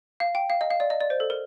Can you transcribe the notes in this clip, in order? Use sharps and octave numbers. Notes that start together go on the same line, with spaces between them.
F5
G5
F5
D#5
F5
D5
D#5
D5
C5
A4
A#4